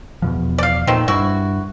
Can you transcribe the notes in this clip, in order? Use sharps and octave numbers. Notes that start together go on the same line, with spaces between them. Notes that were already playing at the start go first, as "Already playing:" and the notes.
E2 B2 F3
D5 F5
A#2 D#3 A3 C4
G2 E4 F#4